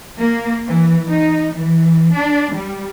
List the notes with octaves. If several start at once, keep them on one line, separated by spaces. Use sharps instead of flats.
A#3
E3
D#4
E3
D4
G3